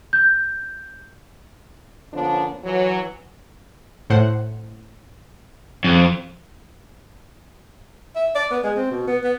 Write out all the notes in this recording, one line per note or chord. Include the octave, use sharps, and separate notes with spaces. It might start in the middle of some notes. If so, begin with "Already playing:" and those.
G6
D3 F3 A#3 B3 C#4 D4
E3 F#3
A2 C5 F#5
F2
E5
D5
B3
G#3
C4
B2
B3
B3